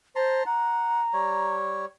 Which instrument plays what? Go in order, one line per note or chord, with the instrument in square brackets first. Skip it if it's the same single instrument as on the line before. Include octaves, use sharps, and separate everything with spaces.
[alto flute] C5 [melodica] A5 A#5 C6
[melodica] F#5 [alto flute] A#5
[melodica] G3 C#5